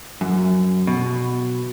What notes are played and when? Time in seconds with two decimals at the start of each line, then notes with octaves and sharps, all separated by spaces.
0.21 F#2
0.87 B2